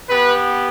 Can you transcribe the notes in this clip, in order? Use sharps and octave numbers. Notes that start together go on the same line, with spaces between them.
B3 G4 B4